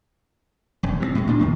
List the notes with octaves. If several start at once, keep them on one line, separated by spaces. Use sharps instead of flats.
E1 F#2
C3 G#3 C4
A2 G#3
D2 A#2 G#3 D4
F2 D#3 A#3